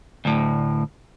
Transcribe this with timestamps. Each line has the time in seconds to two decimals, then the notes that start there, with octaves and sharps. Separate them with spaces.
0.25 D2 A2